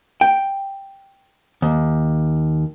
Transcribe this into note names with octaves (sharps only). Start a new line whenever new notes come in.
G5
D#2